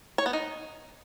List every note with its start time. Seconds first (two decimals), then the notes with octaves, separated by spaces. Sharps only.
0.18 C#5
0.26 B3
0.33 D#4